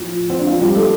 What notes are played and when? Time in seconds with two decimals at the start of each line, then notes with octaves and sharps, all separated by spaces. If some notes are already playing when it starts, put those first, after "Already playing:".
Already playing: A2 F3
0.30 C4
0.38 D4
0.46 F3 F4
0.51 A2
0.61 G3 G4
0.75 A3 A4